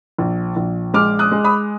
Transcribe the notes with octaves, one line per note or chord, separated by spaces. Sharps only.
A#1
A#1
G#3 D6 F6
D#6 F#6
G#3
B5 D#6